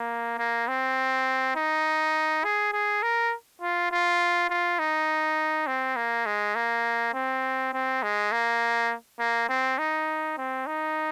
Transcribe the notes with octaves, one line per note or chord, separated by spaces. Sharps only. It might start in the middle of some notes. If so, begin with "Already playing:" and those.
Already playing: A#3
A#3
C4
D#4
G#4
G#4
A#4
F4
F4
F4
D#4
C4
A#3
G#3
A#3
C4
C4
G#3
A#3
A#3
C4
D#4
C4
D#4